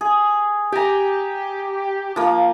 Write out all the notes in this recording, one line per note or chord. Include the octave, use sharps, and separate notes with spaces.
G#4
G4 G#5 A#5
F3 A#3